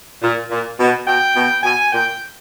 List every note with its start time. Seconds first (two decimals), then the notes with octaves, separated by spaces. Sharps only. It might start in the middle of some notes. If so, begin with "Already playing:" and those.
0.22 A#2
0.51 A#2
0.79 B2
1.07 B2 G5
1.36 B2
1.63 B2 G#5
1.93 A#2 G5